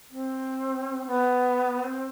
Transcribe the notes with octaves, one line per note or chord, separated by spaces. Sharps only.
C4
B3
C4